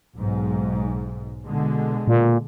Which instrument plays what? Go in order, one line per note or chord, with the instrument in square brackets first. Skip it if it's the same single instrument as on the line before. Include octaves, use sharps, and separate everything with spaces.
[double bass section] B1 G#2
B2 D3 G#3
[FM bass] A#2